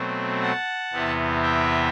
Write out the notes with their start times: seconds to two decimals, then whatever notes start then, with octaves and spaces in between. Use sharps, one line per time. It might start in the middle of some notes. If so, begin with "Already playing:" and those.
Already playing: B2 F#3 A3 C4
0.42 F#5 A5
0.92 E2 C3 E3 B3
1.42 E5 G5